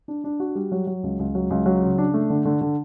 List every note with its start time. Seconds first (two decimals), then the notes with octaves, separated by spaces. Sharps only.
0.08 D4
0.24 D4
0.40 F#4
0.55 G3
0.72 F#3
0.87 F#3
1.03 C#2
1.19 C#2
1.35 F#3
1.50 C#2
1.66 F#3
1.82 C#3
1.98 D4
2.14 A3
2.30 D3
2.45 D3
2.61 D3